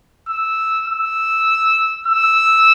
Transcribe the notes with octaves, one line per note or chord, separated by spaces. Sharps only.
E6
E6
E6